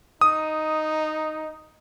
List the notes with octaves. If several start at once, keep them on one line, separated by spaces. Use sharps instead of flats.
D#4 D#6